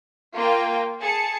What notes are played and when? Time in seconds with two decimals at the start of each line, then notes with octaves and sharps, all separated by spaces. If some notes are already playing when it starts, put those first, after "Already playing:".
0.35 A#3 F4 A#4 F5 G5
1.00 G#4 A5 C#7